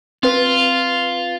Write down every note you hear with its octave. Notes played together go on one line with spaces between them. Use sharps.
C4 F4 B4